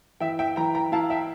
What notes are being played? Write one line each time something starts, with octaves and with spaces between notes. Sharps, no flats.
E3 E5 G5
E5 G5
E3 G5 A#5
G5 A#5
E4 F5 A5
E5 G5